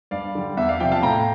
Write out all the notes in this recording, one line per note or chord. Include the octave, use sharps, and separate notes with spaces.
G2 D5 F5
D3 G3
E2 E5
D5 F5
C3 F3 E5 G5
F5 A5
A2 G5 A#5